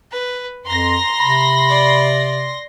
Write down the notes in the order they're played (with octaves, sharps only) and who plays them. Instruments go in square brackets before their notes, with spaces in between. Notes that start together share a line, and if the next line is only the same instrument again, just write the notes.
[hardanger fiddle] B4
[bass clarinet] F2 [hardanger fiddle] A#5 [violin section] C6 A#6
[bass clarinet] C3 [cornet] B5
[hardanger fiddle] D5